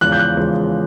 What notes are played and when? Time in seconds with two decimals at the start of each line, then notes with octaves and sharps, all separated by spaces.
0.01 E2 C#3 F3 G#3 F#6
0.12 G6
0.19 F#6
0.37 E2 C#3 F3 G#3